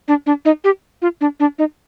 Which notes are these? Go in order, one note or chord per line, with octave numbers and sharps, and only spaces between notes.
D4
D4
D#4
G4
F4
D4
D4
D#4